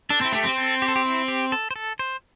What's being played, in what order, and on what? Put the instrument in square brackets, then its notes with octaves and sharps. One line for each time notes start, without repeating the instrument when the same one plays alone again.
[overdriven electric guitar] D4 [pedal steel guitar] A4
[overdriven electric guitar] C4 [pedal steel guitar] E4
[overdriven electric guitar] A3 [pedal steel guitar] G4
[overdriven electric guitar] C4
[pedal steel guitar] C5
A4
G4
A4
G4
E4
G4
A4
C5
A4
C5